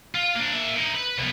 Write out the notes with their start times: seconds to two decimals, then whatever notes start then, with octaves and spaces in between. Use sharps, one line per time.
0.15 F4
0.36 A#3 D4
0.53 A#3 E5
0.77 D#4 E4
0.95 B4
1.18 C2 B3